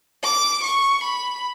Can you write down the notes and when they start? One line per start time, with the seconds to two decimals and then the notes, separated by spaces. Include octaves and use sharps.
0.24 D6
0.64 C#6
1.04 B5